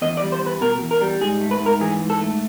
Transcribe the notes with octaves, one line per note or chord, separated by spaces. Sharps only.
E2 D#5
D5
G3
C5
E2 B4
B2 A#4
E2
A#4
G3
G#2 G#4
A3
B4
G#2
A#4
E3 G#4
G#2
A4
A3